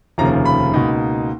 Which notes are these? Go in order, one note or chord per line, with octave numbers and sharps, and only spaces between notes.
F1 D#2 C#3 F3 A#3 A#5
B5
C#2 B2 A#3 D#4